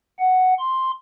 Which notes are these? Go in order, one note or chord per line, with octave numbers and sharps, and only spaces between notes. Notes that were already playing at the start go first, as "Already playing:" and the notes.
F#5
C6